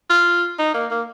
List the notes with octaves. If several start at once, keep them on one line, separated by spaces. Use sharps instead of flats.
F4
D#4
A#3
A#3